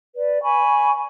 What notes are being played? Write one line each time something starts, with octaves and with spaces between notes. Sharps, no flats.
B4 D5
G#5 B5 C#6